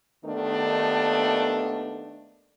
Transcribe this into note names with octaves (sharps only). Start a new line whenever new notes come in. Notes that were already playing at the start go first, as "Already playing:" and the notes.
D#2 D#3 A3 B3 D4